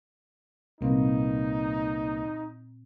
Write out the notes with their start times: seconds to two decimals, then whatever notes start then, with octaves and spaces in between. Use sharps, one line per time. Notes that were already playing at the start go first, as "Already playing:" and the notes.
0.81 C2 A#2 A#3 C4 D#4 B4